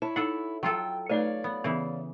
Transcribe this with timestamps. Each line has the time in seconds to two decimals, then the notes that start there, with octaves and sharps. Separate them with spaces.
0.02 E4 C#5 A5
0.16 D#4 A4 F#5
0.63 F#3 F4 A4 G5
1.09 A3 D#4 B4 C#5 D5 F5
1.44 B3
1.64 C#3 E3 B3